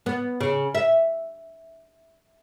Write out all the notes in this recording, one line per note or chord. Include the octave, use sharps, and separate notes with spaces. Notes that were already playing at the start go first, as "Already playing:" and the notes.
B3
C#3
E5